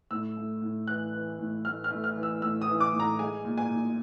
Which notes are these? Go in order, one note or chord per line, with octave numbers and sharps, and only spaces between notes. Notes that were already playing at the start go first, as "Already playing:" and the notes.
A2 E6
A3
A2
E3 F#6
E3
A2
A3 F6
F6
A3
F6
E3
E6
A2 E6
D#6
E3
D6
A2
A#5
G#3 G#5
A#2
G#5
A#2